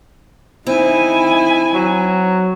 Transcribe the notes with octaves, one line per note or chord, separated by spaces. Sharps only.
C4 D#4 E4 G#5
F#3